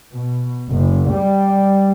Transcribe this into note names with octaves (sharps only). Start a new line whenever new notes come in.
B2
F#1
G3